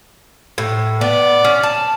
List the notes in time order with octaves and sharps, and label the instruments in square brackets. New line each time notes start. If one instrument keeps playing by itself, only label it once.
[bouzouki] A2
[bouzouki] B3 [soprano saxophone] D5
[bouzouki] C#4
A5